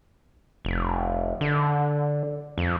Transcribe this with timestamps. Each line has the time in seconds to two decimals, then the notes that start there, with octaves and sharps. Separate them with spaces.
0.65 F1
1.41 D3
2.58 F2